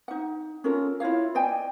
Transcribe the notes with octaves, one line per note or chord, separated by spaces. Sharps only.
D#4 F#5
C#4 F4 A4 A#4
E4 F4 C#5 F5
D5 D#5 G5 G#5